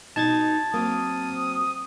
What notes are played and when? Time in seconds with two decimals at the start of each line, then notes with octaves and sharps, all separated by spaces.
0.16 B2 D#4 A5 G#6 A6
0.74 F#3 A#3 C4 D#6